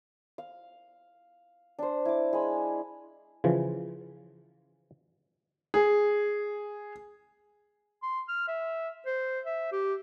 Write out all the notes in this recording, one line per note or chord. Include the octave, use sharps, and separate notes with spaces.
F5
D4 C5
E4 D6
G#3 G#5 B5
C#3 E3 F3
G#4
C6
F6
E5
C5
E5
G4